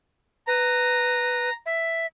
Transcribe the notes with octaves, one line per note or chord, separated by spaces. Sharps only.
B4 A#5
E5